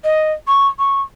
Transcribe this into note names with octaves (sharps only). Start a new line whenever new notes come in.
D#5
C#6
C#6